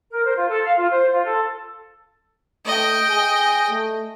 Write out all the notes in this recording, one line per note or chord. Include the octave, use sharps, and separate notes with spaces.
A#4
C5
F4
A4
F5
F4
C5
F4
A4
A3 D#5 G5
G#4
A3